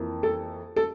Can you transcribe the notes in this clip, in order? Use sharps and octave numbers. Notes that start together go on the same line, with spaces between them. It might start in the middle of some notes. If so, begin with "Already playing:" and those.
Already playing: F2 E3 A#3
A4
A4